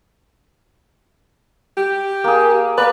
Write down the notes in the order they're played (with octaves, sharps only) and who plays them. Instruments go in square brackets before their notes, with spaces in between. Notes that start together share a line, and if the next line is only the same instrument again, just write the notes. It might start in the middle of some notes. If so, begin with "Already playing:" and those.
[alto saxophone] G4
[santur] A#3 G#4
[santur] A#3 A#4 D5 [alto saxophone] B4